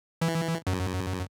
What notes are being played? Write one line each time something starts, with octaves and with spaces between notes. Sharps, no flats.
E3
F#2